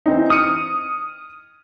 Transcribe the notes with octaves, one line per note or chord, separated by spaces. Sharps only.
E3 C4 D#4
D#6 F6 C#7 D#7